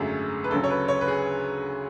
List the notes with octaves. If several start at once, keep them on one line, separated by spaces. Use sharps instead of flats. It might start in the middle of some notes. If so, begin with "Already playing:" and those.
Already playing: G#1 F#2 D3 F#3 A3 G#4
B4
D2 C#3 F#3 A4
C#5
B4
C#5
B4
G#4